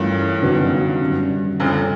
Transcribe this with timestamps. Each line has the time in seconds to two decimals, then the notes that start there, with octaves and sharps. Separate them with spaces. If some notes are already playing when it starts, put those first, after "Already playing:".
Already playing: G1 G2 E3 A3 C#4 F4 A#4
0.41 F#2 D3 F#3 B3 D#4
1.00 F#2 D#3 G3
1.60 F#1 F#2 D3 G3 C4 F4 A4